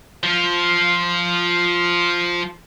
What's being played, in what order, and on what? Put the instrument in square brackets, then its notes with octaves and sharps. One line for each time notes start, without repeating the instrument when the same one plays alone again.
[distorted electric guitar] F3 F4